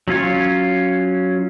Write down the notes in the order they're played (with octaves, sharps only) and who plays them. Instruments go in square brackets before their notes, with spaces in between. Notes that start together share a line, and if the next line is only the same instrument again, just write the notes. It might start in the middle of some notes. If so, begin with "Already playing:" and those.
[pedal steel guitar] F#3 C#4 F4 C#5